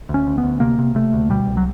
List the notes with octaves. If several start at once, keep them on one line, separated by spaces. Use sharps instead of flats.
D2
C#4
D2
B3
D2
C3 A#3
C3
C3 A3
D2
B2 G3
C2
F#3